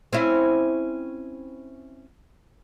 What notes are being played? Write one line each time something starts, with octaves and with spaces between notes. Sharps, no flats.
C4 C#4 E4